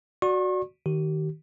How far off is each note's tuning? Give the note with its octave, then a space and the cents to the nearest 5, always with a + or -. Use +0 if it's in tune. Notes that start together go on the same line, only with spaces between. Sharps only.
F#4 +0 D5 +0 C#6 -40
D#3 +0 G4 -40